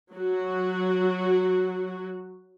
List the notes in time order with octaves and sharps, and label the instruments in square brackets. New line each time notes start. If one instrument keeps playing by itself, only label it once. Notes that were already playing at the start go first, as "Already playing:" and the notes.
[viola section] F#3 F#4